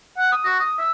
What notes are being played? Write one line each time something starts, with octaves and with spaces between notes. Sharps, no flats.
F#5
D#6
F#4
D#6
E5